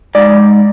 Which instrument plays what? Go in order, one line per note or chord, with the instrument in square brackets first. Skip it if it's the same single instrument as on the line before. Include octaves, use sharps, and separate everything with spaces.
[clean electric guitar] G#2 [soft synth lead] D5